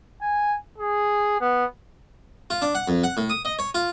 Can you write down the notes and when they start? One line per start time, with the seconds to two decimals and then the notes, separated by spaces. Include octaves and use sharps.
0.22 G#5
0.78 G#4
1.41 B3
2.50 F4
2.62 D4
2.75 F#5
2.88 F2
3.04 F#5
3.17 A2
3.30 D#6
3.45 D#5
3.59 C#5
3.75 F4